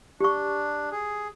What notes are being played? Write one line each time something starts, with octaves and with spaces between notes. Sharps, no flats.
D4 G4 C#6
G#4